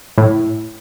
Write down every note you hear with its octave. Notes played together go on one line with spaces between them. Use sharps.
A2